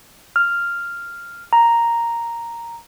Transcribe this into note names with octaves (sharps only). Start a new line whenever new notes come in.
F6
A#5